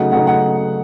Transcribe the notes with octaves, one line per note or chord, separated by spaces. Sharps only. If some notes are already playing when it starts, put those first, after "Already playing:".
Already playing: C#3 F#3 A3 D#4 F#5
C#3 F#3 A3 D#4 F#5
F#5